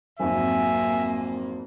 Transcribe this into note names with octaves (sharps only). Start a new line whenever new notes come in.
G#1 F2 F#3 A#3 E5 G#5